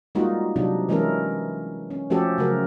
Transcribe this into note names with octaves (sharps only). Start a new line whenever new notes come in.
G3 G#3 A#3 D#4 F4 F#4
C3 F#3 D4 D#4
E3 G#3 C#4 E4 A4 A#4
C#4
F3 A3 C#4 F#4 G4 A4
C#3 F#3 A3 F#4 A#4